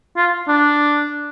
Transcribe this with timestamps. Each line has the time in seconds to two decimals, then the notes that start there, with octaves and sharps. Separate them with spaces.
0.17 F4
0.48 D4